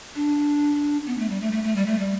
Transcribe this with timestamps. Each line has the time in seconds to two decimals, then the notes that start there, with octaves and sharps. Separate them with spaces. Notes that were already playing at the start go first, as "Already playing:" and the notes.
0.15 D4
1.06 B3
1.18 A3
1.29 G3
1.41 A3
1.52 A3
1.64 A3
1.76 G3
1.86 A3
1.99 G3